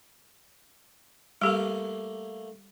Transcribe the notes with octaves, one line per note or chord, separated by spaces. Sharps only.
G3 A3 A#3 G4